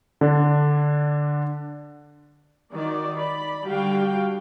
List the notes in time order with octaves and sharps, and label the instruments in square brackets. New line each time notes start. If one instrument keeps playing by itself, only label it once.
[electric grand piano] D3 D4
[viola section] D#3 D#4 F#4 D5
D5 B5
D3 G3 F#4 F5 G5